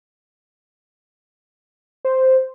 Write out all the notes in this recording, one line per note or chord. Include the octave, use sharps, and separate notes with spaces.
C5